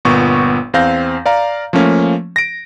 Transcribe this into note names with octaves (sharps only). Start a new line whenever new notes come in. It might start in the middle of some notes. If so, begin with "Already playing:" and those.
G1 A#2 B3 C#6
E2 C4 F5 G6 A#6
D5 F5 A#5
F3 A3 A#3 C#4
A#6 D7